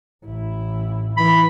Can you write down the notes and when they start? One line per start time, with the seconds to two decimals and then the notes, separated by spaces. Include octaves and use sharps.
0.24 A1 E4
1.17 E3 B5